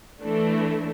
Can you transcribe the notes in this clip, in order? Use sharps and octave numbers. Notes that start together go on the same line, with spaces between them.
E3 A3 D4